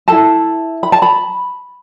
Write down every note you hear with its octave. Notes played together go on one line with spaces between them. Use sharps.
E4 A4 A5
B5
A5
B5